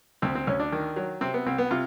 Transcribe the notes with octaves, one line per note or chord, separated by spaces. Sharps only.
D2 C4
C4
D2 C#4
D4
D#3
F#3
C3 C4
B3
C2 C4
B3
C3 F4